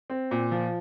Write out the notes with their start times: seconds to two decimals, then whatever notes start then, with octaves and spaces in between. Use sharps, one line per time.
0.10 C4
0.31 A#2
0.51 F3